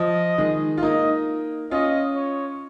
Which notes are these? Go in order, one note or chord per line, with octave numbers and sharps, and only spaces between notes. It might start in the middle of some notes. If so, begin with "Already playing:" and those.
Already playing: F3 D#5
D#3 G#3
F4
A#3 D#4 D#5
C#4 F4 D#5
C#5